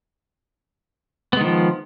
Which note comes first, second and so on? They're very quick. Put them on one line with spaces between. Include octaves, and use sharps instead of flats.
B3 G#3 D#3 F3